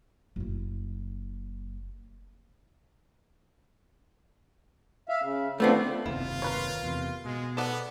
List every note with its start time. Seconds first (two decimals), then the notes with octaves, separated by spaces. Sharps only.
0.36 F#1 E4
5.09 E5 F5
5.22 C#3
5.60 D3 F3 A3 B3 C4 D4
6.06 F#1 D#2 C3 E4 F4
6.42 A#4 B4 C#5
6.83 E2 C3
7.25 B2 G#3
7.57 B3 A4 D5 F#5